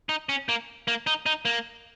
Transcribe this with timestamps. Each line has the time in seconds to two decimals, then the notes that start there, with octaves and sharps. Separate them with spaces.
0.09 D#4
0.29 C#4
0.49 A#3
0.88 A#3
1.07 D#4
1.26 D#4
1.45 A#3